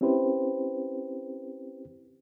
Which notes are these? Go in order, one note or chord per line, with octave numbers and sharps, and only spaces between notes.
C4 C#4 E4 G4 B4 C5